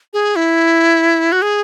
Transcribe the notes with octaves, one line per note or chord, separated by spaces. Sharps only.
G#4
E4
F#4
G#4